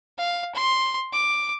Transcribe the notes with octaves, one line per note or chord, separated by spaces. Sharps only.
F5
C6
D6